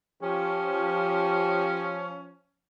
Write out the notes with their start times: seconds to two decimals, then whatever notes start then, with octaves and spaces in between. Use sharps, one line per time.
0.23 F3 C#4 G4